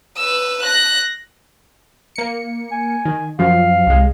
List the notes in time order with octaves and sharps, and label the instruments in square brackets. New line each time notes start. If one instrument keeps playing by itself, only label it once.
[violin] B4 E6
F#6 A#6
[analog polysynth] A#3 C#7
[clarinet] G#5
[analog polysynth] D#3
[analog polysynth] F#2 F3 [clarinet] F5
[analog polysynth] C2 G#3